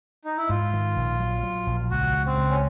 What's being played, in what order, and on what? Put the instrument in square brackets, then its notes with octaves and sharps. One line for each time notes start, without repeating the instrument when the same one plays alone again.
[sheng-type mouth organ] D#4
E4
[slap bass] G#2 [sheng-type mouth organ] F4
[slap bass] D#3
A#1
F#3
F#3
A#1
[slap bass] C#2 [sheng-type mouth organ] F#4
[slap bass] C#3
[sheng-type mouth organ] C4
[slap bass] C#2
[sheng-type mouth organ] C#4